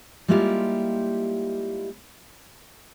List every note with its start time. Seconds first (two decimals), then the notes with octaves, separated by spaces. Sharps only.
0.28 G3 G#3 A#3 E4 F4 G4